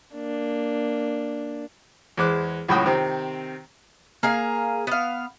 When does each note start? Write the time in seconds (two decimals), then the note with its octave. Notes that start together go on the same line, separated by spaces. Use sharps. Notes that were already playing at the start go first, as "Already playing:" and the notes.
0.15 A#3 D4
2.17 E2 G#3 C5 D6 F#6
2.68 C#2 F#2 A2 F#4 G5 D#6
2.86 C3 D#3 C4
4.23 A#3 G#4 F5
4.87 B3 F5